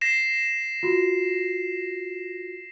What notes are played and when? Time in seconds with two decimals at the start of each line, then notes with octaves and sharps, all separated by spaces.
0.01 A#6 C7 E7
0.83 F4 F#4